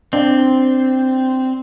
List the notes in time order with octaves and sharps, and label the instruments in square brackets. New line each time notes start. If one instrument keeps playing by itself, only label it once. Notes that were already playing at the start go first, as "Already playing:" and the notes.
[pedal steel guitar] C4 [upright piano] D4